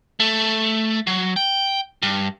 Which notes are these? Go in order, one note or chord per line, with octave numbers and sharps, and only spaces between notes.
A3
F#3
G5
G2